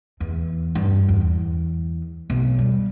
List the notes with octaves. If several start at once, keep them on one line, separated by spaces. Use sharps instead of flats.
E2
G2
E2
B1
G3